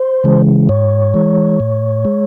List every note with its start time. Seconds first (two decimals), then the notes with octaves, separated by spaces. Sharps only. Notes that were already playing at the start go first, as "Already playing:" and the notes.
Already playing: C5
0.24 C#3 E3 G#3
0.69 G#2 C#5
1.14 E3 G#3
1.60 A2
2.05 G#3